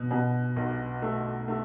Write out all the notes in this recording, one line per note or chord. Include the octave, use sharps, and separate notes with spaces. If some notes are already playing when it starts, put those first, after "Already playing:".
Already playing: B2
B2
B1
A3
A3